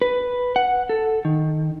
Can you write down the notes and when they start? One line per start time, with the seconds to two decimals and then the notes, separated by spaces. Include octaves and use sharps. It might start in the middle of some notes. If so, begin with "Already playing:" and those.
0.02 B4
0.56 F#5
0.89 A4
1.25 D#3